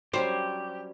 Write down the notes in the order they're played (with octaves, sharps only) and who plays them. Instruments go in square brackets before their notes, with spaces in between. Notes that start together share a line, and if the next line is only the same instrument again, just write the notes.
[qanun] F#3 G3 C#4 [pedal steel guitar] G4 [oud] C5